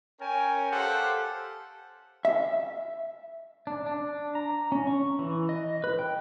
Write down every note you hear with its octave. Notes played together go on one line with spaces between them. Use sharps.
C#4 A#4 C#5 G5 G#5
G4 A4 C5 F5 F#5
E5
D4
D4
A#5
C#4
C#6
E3
D#5
B4
G5